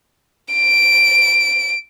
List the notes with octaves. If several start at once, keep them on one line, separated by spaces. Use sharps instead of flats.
D7